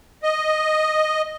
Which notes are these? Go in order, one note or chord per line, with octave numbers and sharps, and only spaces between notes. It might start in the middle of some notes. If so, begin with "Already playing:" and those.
D#5